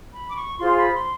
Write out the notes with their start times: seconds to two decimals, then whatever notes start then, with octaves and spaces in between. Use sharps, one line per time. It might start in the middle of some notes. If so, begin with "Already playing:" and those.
0.13 B5
0.30 D6
0.37 C#6
0.59 F4 G#4 C5 C6
0.77 B5
0.94 C6